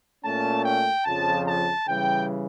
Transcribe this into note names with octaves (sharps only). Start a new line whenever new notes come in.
A#2 A3 C#4 A5
G5
F2 C#3 F3 A5
A5
C#3 E3 G3 G5